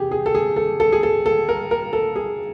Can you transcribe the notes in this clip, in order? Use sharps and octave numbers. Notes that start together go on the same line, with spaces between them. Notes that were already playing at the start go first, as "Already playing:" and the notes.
Already playing: E2 C3 G4 G#4
G#4
A4
G#4
A4
A4
G#4
A4
A4
A#4
A#4
A4
G#4